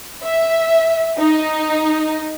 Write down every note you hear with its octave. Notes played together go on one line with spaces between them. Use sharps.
E5
D#4